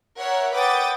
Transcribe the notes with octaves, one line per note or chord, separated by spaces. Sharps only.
A#4 C#5 E5 F#5
B4 F#5 G5 D6 D#6 A6